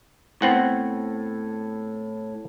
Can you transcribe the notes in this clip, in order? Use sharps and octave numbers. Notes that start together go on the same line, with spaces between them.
A2 B3 C4 F#5